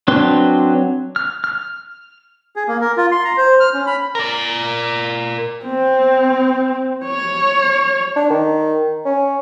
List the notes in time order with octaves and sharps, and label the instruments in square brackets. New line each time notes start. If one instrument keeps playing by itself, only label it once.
[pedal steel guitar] F#3 C4 D4 B4 C6
F6
F6
[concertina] G#4
A#3
A#4
F4
C6
A#5
C5
F6
C#4
B5
[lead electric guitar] A#4 D5
[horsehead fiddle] C4
C#5
[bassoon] D4
D#3
C#4